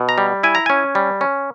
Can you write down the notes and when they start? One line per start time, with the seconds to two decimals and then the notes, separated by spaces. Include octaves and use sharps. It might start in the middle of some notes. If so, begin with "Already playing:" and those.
Already playing: B2
0.09 A#5
0.18 G3
0.43 E4 G#5
0.55 A#5
0.66 C#4 G#5
0.95 G3
1.21 C#4